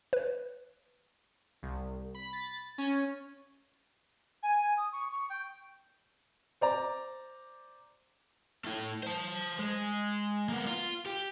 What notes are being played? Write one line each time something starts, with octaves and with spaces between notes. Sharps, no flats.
B4
C2
B5
A6
C#4
G#5
G#5
D#6
C#6
C#6
G5
C5 D5 A#5
A3 E4
C5 A5
G#3
A#3 B3
F4
G4